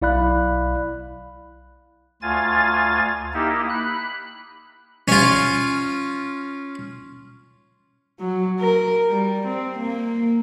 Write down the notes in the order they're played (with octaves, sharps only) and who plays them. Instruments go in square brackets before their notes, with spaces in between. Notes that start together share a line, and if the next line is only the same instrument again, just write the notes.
[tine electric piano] B1 E4 D5 F5 B5 F#6
[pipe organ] D2 F4 G#5 A6
A#3 D#4 E4 G4
B5 F#6
[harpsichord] C#4 F4
[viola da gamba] F#3
A#4
G3
C4
A#3